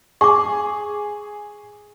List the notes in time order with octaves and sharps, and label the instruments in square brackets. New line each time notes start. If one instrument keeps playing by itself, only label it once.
[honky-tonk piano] G#4 [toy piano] C#6 D6